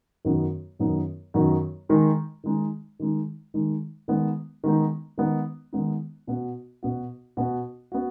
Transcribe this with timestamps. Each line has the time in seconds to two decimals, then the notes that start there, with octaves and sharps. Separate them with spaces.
0.25 F#2 D#3 F#3 B3 D#4
0.79 F#2 D#3 F#3 B3 D#4
1.34 F#2 D#3 F#3 B3 D#4
1.89 D#3 G#3 D#4
2.44 D#3 G#3 D#4
2.99 D#3 G#3 D#4
3.54 D#3 G#3 D#4
4.08 D#3 G#3 B3 D#4
4.64 D#3 G#3 B3 D#4
5.18 D#3 G#3 B3 D#4
5.73 D#3 G#3 B3 D#4
6.27 B2 B3 F#4
6.83 B2 B3 F#4
7.37 B2 B3 F#4
7.92 B3 F#4